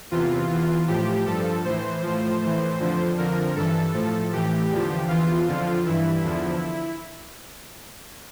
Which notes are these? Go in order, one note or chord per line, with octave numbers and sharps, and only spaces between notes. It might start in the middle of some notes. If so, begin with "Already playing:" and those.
E2 C3 E3 F4
E2 E3
A2 F3 G4
G2 F3 A4
A2 E3 C5
A2 F3
A2 E3
F2 D3 F3
F2 D3 F3 A#4
G2 E3 A4
A2 F3 A4
A2 E3 G4
E2 D3 F3
E2 E3 F4
F2 D3 F3
G2 E3 E4
E2 D3 F3